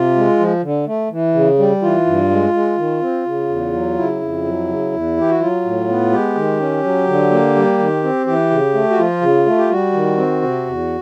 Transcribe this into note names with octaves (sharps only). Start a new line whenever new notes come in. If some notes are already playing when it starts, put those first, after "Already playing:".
Already playing: C3 F4
G#3
F3
D3
A3
E3
C#3
G3
E3 F4
G2
G#3
G#3
D#3
C4
C#3
E2
F#3
C#3 E4
F2
F#3
C#3
E2
E3 G4
F#4
F#3 F4
A2
B3
G#3 G4
D#3
C#4
F#3
D3
A#3
G3
D#3
C4
E3 G4
C#3
A3
F#4
F3 F4
C#3
A3
G4
G3 F#4
D#3
C4
C3
E2